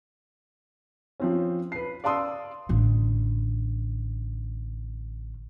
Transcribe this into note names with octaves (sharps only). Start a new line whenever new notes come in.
F3 C4 C#4
B4 C7
D5 F5 A5 C6 D#6 E6
A1 D3